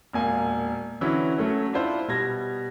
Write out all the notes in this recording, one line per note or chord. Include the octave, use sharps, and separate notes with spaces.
E1 A#2 A#3 G#5
D3 E3 F#3 C#4 E4
F#3 A3 C#4
D4 E4 F4 C5
B2 G3 G#6 A#6